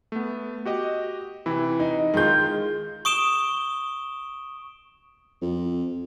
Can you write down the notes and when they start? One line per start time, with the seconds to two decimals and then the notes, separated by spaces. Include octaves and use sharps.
0.12 A3 B3
0.66 F#4 G4 D#5
1.46 C3 E3 E4
1.79 D#4
2.14 D#3 G#3 F4 G6
3.05 C#6 D#6 D7 E7 G7
5.42 F2